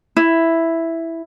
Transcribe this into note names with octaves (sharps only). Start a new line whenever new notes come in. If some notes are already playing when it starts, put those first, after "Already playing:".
E4